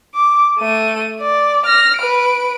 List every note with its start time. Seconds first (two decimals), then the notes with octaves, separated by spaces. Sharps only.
0.15 D6
0.59 A3 D#7
1.21 D5
1.66 F6 A#6
1.97 B4 D7